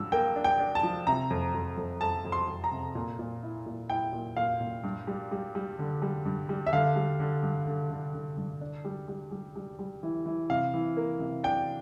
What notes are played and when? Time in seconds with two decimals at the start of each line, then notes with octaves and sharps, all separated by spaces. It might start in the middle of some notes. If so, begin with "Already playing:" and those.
Already playing: G2 F3 E6
0.12 A#3 G5
0.36 D4
0.44 G5
0.59 D4
0.75 A5
0.83 F3
1.07 C3 A#5
1.30 F2
1.54 F2
1.77 F2
2.01 F2 A5
2.25 F2
2.32 C6
2.48 F2
2.64 A#5
2.71 C3
2.95 A#2
3.19 A#2
3.43 E4
3.66 A#2
3.90 E4 G5
4.13 A#2
4.37 A#2 F5
4.60 A#2
4.84 G2
5.07 G3
5.31 G3
5.55 G3
5.79 D3
6.02 G3
6.26 G2
6.49 G3
6.66 E5
6.73 D3 F5
6.96 G3
7.20 D3
7.43 G2
7.67 D3
7.90 D3
8.14 D3
8.37 G2
8.61 D4
8.85 G3
9.08 G3
9.31 G3
9.56 G3
9.79 G3
10.03 E3
10.26 E3
10.50 C3 F5
10.74 E3
10.97 A#3
11.20 C3
11.44 D4 G5